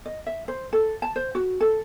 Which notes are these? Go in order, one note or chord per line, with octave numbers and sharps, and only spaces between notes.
D#5
E5
C5
A4
A5
C5
F#4
A4